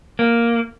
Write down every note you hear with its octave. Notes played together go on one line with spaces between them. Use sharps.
A#3